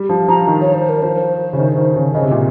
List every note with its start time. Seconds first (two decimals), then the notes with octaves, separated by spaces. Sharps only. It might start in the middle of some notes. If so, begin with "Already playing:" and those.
Already playing: G3
0.09 F3
0.28 F3 A#5
0.47 D#3
0.61 C#5
0.74 C5
0.89 A#4
1.02 F3 C5
1.53 C#3
1.58 D#3
1.77 D#3
1.96 C#3
2.14 C#3 D#5
2.23 C3
2.31 A#2